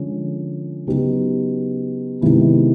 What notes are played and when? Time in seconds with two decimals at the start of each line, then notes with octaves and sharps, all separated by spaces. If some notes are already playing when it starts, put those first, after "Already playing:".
Already playing: D3 F3 G#3 C#4
0.87 C#3 F#3 B3 D#4 G4
2.21 C3 D#3 G#3 B3 E4